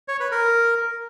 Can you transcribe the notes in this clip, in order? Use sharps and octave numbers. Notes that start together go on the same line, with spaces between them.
C#5
B4
A#4